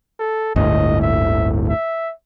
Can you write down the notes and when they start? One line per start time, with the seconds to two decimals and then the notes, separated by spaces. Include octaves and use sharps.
0.20 A4
0.56 G1 D2 A2 D#5
1.02 E5
1.69 E5